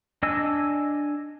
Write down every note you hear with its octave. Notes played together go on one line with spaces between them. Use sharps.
D4 D#5 G#5 E6